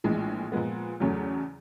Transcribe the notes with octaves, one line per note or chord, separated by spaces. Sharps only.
A#1 A2 E3 G#3
A#2 F3 G#3 B3
E2 C#3 F#3 A3 C#4